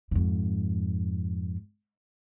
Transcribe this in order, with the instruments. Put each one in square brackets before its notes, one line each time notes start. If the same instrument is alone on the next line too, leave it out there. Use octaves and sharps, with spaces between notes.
[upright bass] F2 G#2